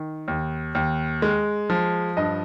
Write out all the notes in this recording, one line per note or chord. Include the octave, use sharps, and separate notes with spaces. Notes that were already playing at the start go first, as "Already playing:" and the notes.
Already playing: D#3
D#2
D#2
G#3
F3
G2 D#5